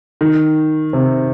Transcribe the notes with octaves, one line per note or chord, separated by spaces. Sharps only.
D#3
C3